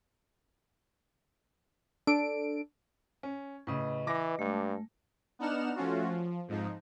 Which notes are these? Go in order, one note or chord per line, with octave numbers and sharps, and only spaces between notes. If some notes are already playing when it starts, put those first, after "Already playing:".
D4 A4 D7
C#4
A2 C#3 B4 D#5
E3 D6 A#6
G2 G#3 A3
B3 D4 D#4 F#5 F6 E7
F3 A3 C#4 F4 F#4
F3
F2 G#2 F3 D#4